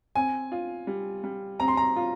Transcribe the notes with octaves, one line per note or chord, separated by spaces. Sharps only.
C4 G#5
F4
G3
G3
C4 A#5
C6
A#5
F4